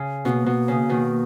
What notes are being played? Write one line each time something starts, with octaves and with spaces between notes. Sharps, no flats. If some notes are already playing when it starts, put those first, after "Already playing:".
Already playing: C#3
B2 A#3 C#4
B2
C#3
B2 D#3